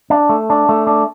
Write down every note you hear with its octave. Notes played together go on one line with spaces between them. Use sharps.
D4
A3
D4
A3
D4